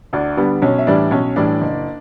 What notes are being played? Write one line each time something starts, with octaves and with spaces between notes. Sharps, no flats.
D2 D4 D5
D3 G3 B3
B1 C#4 C#5
E5
A2 E3 G3 D4 D5
B1 C#4 C#5
A2 E3 G3 D4 D5
F#1